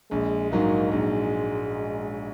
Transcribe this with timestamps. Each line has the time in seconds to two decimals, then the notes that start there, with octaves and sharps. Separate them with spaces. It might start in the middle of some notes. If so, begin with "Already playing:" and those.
0.11 A#1 G#3
0.51 G#2 F#3 A#3 D#4
0.91 A#1 G#3